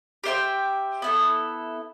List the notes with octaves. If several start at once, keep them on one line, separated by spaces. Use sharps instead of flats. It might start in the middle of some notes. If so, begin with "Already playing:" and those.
G4 C5 E5 G5
B3 E4 A4